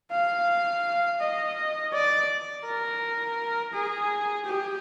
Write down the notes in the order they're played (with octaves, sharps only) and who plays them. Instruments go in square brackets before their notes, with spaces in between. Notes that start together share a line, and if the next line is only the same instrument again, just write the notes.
[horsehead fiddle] F5
D#5
D5
A#4
G#4
G4